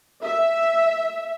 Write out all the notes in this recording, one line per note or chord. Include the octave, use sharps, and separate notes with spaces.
E5